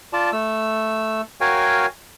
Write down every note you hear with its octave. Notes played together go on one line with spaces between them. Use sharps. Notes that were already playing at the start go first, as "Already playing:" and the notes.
F4 D5 A5
A3 E6
F#4 A#4 C#5 F5 G5 G#5